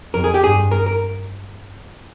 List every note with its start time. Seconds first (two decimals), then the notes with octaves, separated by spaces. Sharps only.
0.14 F2 A#4
0.24 G#4
0.34 G4
0.43 G2 G#4
0.71 A#4
0.86 A#4